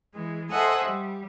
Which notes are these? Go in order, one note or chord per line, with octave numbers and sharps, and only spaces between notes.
E3 G#3
A4 C5 D#5 E5 F#5 G#5
G3